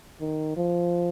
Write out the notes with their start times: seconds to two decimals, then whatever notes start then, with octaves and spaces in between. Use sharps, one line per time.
0.20 D#3
0.56 F3